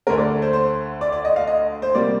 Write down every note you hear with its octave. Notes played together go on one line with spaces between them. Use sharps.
D2 D3 A3 A#4
D5
C5
C5
D5
D5
D#5
F5
D#5
C5
C3 G3 A#3 D5